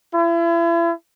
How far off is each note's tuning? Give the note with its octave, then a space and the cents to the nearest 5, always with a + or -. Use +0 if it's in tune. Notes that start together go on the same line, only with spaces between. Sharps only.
E4 +40